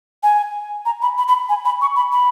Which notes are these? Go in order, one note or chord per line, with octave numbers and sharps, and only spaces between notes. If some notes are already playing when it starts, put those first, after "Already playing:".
G#5
A#5
B5
B5
B5
G#5
B5
C#6
B5
B5